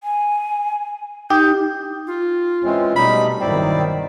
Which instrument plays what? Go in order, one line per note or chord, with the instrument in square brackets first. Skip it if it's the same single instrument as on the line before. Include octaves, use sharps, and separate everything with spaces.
[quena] G#5
[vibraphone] D#4 [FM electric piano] G4 [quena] G6
[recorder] F4
[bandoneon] E3 G#3 C4 [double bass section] C#4
[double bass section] B2 [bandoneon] G3 A3 D#4 [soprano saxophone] B5
[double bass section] G1 D#3 [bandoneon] F#3 E4 [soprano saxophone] C4 [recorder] D5